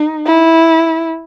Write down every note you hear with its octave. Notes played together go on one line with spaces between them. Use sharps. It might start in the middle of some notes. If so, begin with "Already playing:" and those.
Already playing: D#4
E4